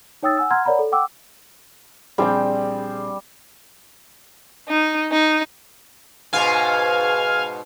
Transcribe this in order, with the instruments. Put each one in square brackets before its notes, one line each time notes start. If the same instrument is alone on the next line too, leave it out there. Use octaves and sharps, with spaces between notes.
[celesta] D#4 C#5 G5 D#6 E6 A6
F#5 G#5 E6
F#5 A#5 C6 F6 G#6
A#4 C#5 D5 F#5 A#5 B5
A4
F#5 G5 D6 E6
[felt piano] A#1 C4 G#4 [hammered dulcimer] G3 G5
[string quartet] D#4
D#4
[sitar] G#2 B2 B3 [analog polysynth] F5 G#5